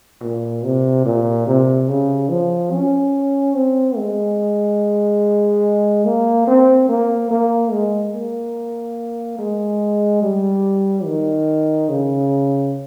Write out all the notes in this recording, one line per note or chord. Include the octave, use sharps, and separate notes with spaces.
A#2
C3
A#2
C3
C#3
F3
C#4
C4
G#3
A#3
C4
A#3
A#3
G#3
A#3
G#3
G3
D#3
C#3